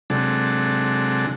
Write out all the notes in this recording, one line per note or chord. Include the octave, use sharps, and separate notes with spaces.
C3 F#3 G#3 D4 A4